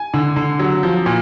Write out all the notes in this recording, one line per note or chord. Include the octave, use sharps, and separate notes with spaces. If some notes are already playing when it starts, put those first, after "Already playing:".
Already playing: G#5
D3
D3
F#3
F3
A#2